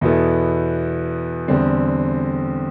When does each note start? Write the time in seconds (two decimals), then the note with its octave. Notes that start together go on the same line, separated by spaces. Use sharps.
0.01 E2 B2 B3 E4 A4
1.48 E2 D3 G3 C4